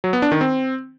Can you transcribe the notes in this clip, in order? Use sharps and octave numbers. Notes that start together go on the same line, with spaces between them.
F#3
B3
D4
D#3
C4